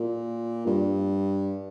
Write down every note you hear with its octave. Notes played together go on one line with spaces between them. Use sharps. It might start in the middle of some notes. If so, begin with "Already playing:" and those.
Already playing: A#2
G2